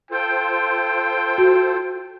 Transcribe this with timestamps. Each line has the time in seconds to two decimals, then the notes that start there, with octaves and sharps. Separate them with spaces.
0.11 F4 A4 C5 G5
1.38 F#4